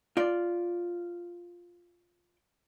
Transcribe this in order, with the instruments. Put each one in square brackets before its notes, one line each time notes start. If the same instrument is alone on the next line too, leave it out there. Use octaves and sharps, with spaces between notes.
[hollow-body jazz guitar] F4 D5